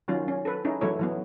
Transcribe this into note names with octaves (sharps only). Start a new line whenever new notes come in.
D#3 F#3 C#4 F4
C#4
A4 B4
C#4 D#4 E4
E3 F#3 A3 E4 C#5
E3 F#3 B3